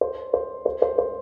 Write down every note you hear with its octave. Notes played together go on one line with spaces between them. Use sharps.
C5
C5
C5
C5
C5